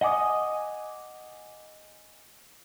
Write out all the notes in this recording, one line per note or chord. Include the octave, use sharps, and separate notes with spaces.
D#5 F#5 G#5 D6 D#6